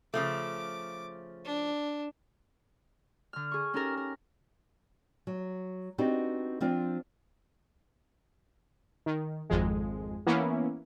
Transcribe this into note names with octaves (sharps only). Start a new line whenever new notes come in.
C#3 F3 A3 D6
D4
D3 F6
G#4 C#6
C#4 D#4 G4 A4 A#4
A#4
F#3
B3 C4 D4 D#4 F#4 G4
F3 C4 D4 F4
D#3
G#1 F2 G#3
E3 A#3 B3 C#4 E4